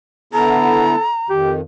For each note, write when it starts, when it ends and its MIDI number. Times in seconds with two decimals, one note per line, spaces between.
0.33 0.95 50
0.33 0.95 59
0.33 0.95 64
0.33 1.08 69
0.33 1.28 82
1.30 1.61 41
1.30 1.61 51
1.30 1.52 67